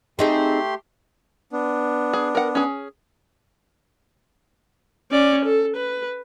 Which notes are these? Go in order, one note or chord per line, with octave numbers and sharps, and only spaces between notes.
A3 C4 D#4 G4 G#4 C6
B3 D4
G#4
A#4 F#5
C#4 G#4
C#4 D5
A4
B4